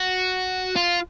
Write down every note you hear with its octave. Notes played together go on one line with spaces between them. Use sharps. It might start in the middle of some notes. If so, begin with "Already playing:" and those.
Already playing: F#4
F4